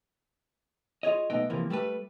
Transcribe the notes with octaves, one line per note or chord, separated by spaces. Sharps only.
F4 G#4 C#5 D#5
B1 A3 B3 D#4 D#5 G5
C3 E3 F3 A#3
G3 A3 A4 B4